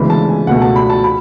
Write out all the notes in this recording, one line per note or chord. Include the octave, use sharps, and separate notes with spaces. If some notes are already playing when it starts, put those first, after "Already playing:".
Already playing: D2 C#3 E3 G#3 B3 B5
A5
G#5
C#2 B2 A3 F#5
A5
B5
A5
B5